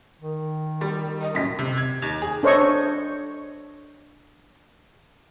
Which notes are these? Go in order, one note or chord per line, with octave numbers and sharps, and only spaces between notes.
D#3
G3
D#5
F#2 A2 B6
C3
G#6
D#2
G#4
D4 A4 C5 C#5 D#5 C#6